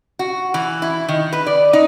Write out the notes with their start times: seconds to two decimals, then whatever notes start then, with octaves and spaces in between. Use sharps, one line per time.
0.19 F#4
0.54 E3
0.82 E4
1.09 D#3
1.33 B4
1.47 D5
1.73 D#4